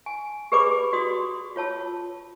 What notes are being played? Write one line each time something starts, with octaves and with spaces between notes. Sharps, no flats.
G#5
G4 G#4 B4 D5 B5 D6
F#4 D5 C6 D#6
F4 C#5 A5 E6